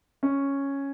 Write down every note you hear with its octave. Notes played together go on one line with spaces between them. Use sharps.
C#4